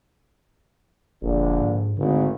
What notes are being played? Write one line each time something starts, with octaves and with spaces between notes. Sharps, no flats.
F1 A#1 D3 D4
G#2
G#1 D2 D3